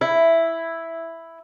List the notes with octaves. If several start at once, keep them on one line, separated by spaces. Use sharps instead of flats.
E4